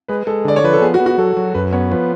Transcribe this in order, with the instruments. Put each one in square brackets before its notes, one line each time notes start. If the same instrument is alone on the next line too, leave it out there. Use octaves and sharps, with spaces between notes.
[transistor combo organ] G#3 [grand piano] B4
[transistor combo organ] G#3 [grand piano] A4
[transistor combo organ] D3 [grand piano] D5
[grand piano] C#5
[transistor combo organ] F3 [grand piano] B4
[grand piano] A4
[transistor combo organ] B3 [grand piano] G#4
[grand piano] F#4
[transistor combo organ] B3
[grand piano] F#4
[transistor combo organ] F#3 [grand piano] A4
[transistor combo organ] F#3
[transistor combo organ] F#2 [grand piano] B4
[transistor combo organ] B3 [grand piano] C#5
[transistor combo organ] F3 [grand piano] B4